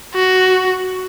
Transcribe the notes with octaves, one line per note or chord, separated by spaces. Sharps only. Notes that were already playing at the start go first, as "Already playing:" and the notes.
F#4